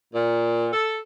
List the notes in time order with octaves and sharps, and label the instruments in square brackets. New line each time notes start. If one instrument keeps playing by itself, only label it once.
[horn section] A#2
A4